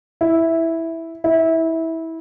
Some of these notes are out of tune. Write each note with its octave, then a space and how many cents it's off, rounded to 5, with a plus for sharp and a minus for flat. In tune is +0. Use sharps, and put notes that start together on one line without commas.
E4 -5
E4 -20